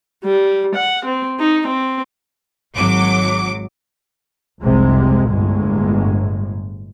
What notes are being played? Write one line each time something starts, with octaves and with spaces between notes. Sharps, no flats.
G3
F#5
C4
D#4
C4
G#1 F#3 D6
F1 C2 C3 G#3
G1 A2 G#3